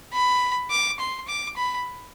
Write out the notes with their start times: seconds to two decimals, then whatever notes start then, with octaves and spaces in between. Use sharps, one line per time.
0.13 B5
0.71 D6
0.99 C6
1.28 D6
1.56 B5